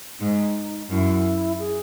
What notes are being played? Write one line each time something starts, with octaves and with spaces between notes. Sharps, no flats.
G#2 D#4
F#2 E4
G#4